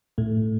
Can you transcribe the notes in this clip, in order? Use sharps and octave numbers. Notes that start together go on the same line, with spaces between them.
A2 A3